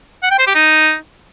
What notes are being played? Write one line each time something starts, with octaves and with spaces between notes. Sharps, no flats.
F#5
G5
C5
G4
D#4